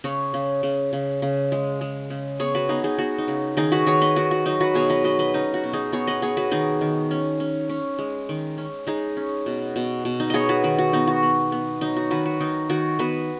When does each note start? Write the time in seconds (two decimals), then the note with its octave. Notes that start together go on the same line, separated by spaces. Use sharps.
0.04 C#3 G#4 C#5
0.34 C#3
0.63 C#3
0.93 C#3
1.22 C#3
1.52 G#3
1.81 G#3
2.10 C#3
2.40 B3 G#4 C#5
2.55 F#4 B4
2.69 B3 D#4 G#4
2.84 D#4 G#4
2.98 B3 F#4
3.18 D#4
3.28 C#3
3.57 D#3 D#4 G#4
3.72 F#4 B4
3.86 D#3 G#4 C#5
4.01 B4 D#5
4.16 D#3 F#4
4.31 F#4
4.46 F#3 D#4
4.60 F#4 B4
4.74 B2 G#4 C#5
4.90 B4 D#5
5.04 F#3 B4 D#5
5.19 B4 D#5
5.34 C#4 D#4
5.54 F#4
5.64 B2
5.73 D#4 G#4
5.92 B3 G#4 C#5
6.07 B4 D#5
6.22 B3 G#4 C#5
6.37 F#4 B4
6.51 D#3 D#4 G#4
6.81 D#3
7.11 C#4
7.40 C#4
7.70 C#4
7.99 G#3
8.29 D#3
8.58 C#4
8.87 G#3 D#4 G#4
9.17 C#4
9.46 B2
9.76 B2
10.05 B2
10.20 D#4
10.30 B3 G#4 C#5 D#5
10.49 F#4 B4
10.64 D#3 F#4
10.78 F#4
10.93 B3 D#4
11.07 F#4
11.23 B3
11.52 B3
11.81 F#3 D#4
11.97 F#4
12.11 D#3 F#4 B4
12.26 F#4
12.40 D#3 D#4
12.70 D#3 F#4
12.99 B3 F#4 B4